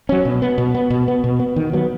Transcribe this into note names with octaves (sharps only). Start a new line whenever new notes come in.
F#3 C#4
B2
B3
B2
B3
B2
B3
B2
B3
D#3
F#3 B3